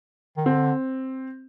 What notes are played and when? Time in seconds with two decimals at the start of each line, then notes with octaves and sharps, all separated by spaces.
0.37 D#3
0.45 D3 C4